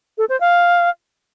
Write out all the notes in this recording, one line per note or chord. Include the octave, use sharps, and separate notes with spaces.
A4
C5
F5